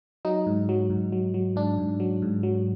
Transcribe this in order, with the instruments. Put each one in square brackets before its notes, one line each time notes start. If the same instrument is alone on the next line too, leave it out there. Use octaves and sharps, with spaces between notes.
[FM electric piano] F#3 D#4
G#2
F#3
G#2
F#3
F#3
G#2 D4
G#2
F#3
G#2
F#3